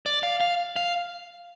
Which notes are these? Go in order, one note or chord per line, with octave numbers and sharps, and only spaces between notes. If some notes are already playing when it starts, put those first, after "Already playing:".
D5
F5
F5
F5